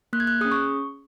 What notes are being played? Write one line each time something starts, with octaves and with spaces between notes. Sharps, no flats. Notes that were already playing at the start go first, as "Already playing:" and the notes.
A#3 F#6
G#6
F#6
C#4 G#4 D#6
C#6